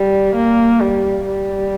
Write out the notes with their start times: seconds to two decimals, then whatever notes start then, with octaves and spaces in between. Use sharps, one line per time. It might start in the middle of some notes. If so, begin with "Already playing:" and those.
Already playing: G3
0.35 A#3
0.80 G3
1.26 G3